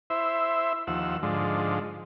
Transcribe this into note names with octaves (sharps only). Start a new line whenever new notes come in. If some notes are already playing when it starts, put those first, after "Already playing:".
E4 C5 E5
D#2 F3 F#5 E6
G#2 D3 F3